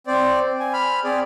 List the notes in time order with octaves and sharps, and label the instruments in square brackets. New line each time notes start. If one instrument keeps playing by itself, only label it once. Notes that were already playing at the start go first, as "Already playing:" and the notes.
[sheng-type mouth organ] C4 C5 D5
G#5
B5 F6
C4 G#4 D5